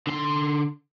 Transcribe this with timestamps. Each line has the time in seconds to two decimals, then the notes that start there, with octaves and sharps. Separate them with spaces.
0.07 D3 C6